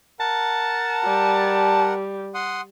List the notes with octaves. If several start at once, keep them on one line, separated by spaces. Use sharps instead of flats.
A#4 F#5 A5
G3
F#5 C6 D#6